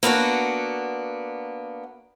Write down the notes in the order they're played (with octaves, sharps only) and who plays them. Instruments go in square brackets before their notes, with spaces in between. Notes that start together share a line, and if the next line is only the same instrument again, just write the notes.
[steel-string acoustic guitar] A#3 B3 D4 F#4